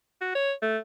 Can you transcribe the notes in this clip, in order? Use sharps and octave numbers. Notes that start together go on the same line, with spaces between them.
F#4
C#5
A3